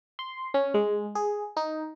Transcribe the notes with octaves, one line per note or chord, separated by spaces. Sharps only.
C6
C#4
G#3
G#4
D#4